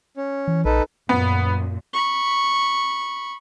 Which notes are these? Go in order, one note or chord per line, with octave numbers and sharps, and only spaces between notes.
C#4
E3
A#1 D#4 A4 B4
F#2 A#2 B3
B5 C#6